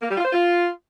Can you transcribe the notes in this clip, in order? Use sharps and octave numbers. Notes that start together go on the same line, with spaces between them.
A#3
G3
F4
C5
F4